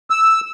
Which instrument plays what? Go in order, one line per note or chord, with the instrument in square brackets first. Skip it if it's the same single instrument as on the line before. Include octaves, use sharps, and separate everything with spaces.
[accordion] E6